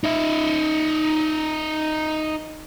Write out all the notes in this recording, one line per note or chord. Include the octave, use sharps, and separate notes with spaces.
D#4 E5